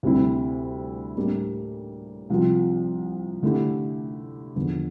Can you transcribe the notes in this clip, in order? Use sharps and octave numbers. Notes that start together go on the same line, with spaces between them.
D2 C3 G3 C4 E4
A2 G3 A#3 D4 G4
C2 C3 F3 C4 F4
D3 A3 E4 G4
E2 D3 F3